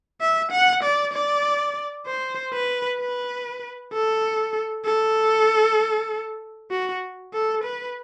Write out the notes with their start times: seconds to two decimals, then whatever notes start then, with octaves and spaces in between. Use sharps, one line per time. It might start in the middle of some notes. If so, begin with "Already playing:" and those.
0.21 E5
0.52 F#5
0.84 D5
1.13 D5
2.07 C5
2.53 B4
2.99 B4
3.93 A4
4.85 A4
6.71 F#4
7.33 A4
7.64 B4